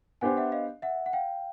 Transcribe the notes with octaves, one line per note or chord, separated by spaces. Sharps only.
B3 D4 G4 C5 F#5 G#5
E5 F#5
D#5 F5
E5 F#5
F#5
F5 G5